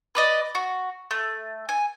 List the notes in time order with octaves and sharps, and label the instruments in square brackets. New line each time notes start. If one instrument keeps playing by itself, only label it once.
[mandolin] B4 D5 D#5
F#4
A3
G#5